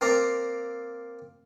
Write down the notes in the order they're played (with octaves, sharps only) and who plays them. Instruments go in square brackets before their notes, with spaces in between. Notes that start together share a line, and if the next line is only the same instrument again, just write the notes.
[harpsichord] A#3 C4 A#4 D5 F5 A#5